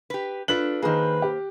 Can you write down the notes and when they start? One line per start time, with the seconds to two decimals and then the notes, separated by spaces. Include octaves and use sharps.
0.10 G4 B4
0.48 D4 F4 A4 B4 F#6 F#7
0.83 D#3 A#3 G#4 B4 C5
1.22 G4